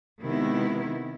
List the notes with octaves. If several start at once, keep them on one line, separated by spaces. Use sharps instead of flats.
C3 D#3 G#3 B3 E4